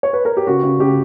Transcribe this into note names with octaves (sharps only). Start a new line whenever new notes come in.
C#5
B4
A#4
G4
C#3 F#4
C#3
C#3 G4